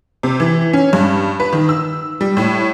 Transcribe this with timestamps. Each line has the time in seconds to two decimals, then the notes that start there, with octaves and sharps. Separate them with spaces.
0.23 C3
0.40 E3
0.73 C#4
0.93 G2
1.40 B4
1.53 D#3
1.69 E6
2.21 G3
2.37 A2